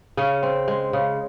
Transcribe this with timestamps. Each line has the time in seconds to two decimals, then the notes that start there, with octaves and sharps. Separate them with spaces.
0.17 C#3 C#4
0.43 C4
0.68 G#3
0.93 C#3